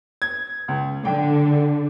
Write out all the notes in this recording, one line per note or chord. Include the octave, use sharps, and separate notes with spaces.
G#6
C#2
D3 G5